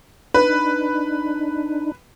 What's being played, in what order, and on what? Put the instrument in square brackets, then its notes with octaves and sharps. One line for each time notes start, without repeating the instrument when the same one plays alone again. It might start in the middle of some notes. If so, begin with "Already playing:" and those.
[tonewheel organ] D4 D#4 [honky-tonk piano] B4